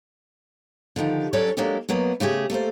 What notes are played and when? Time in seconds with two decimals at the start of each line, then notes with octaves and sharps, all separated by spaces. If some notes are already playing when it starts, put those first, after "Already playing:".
0.96 D3 D#3 F3 G4
1.33 F#3 C#4 D4 A4 C#5 D5
1.57 F#3 G#3 A#3 D4 G4 A4
1.89 B2 F#3 A#3 B3
2.20 C#3 A3 G4 G#4
2.50 A3 A#3 A4 C5